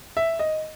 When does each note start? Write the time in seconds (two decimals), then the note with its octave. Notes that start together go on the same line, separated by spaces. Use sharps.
0.17 E5
0.39 D#5